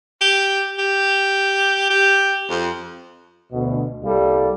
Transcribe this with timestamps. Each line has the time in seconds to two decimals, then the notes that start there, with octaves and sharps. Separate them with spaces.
0.21 G4
0.79 G4
1.90 G4
2.50 F2
3.52 D2 B2
4.04 C2 G3 A#3 A4